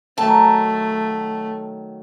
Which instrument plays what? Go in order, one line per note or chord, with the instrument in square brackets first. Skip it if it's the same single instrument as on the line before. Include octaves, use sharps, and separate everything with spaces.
[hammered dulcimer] D#3 F#3 [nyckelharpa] A3 [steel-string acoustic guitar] A5